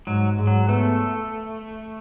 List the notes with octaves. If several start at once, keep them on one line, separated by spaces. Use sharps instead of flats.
G#2 F#3
G#2
F#3
A3 B3